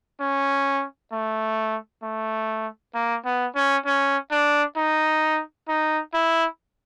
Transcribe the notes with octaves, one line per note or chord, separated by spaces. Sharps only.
C#4
A3
A3
A#3
B3
C#4
C#4
D4
D#4
D#4
E4